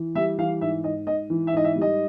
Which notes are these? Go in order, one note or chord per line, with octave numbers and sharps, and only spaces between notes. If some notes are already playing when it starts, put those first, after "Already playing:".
Already playing: E3
G3 E5
E3 F5
G#2 E5
G#2 D#5
G#2 D#5
E3
E5
G#2 D#5
E5
G3
D#5